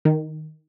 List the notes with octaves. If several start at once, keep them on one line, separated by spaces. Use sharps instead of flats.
D#3